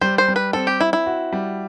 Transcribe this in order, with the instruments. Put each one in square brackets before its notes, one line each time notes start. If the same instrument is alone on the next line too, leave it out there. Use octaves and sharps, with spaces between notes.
[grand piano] G3 [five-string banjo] C5
[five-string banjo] C5
[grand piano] G3
[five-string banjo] B4
[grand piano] C4 [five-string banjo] A4
[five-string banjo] G4
[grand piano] C4 [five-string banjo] E4
[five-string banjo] E4
[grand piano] F#4
G3